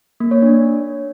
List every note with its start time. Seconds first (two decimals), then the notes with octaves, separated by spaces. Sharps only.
0.20 A#3
0.31 C#5
0.42 D4